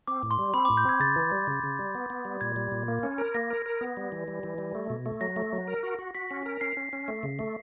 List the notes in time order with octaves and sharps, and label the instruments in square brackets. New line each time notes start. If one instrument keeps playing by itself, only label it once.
[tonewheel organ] C4 [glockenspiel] D6
[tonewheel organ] A2
[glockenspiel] C6
[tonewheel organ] G3
[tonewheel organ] C4 [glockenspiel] B5
[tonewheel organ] A2 [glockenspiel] D6
[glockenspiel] G6
[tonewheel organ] C4 [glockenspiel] G#6
[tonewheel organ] C#3 [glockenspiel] A6
[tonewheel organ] E3
G3
C#3
C#3
G3
B3
B3
G3
[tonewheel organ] A#2 [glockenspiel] G#6
[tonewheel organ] G3
A#2
A#3
C#4
A#4
[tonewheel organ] A#3 [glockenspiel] A#6
[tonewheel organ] A#4
A#4
B3
G3
E3
G3
E3
G3
A3
B2
A3
[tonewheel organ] F#3 [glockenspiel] A#6
[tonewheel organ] A3
F#3
A#4
F#4
F#4
[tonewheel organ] F#4 [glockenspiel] B6
[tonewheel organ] C#4
A#4
[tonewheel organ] C#4 [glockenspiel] C7
[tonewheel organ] C#4
C#4
A3
C#3
A3